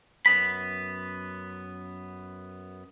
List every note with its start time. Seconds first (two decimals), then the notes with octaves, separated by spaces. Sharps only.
0.26 F#2 B3 B5